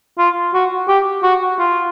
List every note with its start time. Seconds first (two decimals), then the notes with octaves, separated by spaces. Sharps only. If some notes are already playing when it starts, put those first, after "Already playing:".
0.18 F4
0.54 F#4
0.88 G4
1.23 F#4
1.59 F4